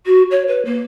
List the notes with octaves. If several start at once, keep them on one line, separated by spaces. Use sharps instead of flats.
F#4
C#5
B4
A#3